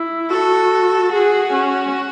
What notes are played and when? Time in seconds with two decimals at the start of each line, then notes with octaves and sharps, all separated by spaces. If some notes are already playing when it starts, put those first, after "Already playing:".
Already playing: E4
0.30 F#4 A4
1.12 F#4 G#4
1.53 C#4